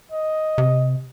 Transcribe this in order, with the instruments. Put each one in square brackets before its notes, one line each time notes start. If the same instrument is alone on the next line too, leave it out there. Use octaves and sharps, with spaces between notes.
[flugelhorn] D#5
[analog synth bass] C3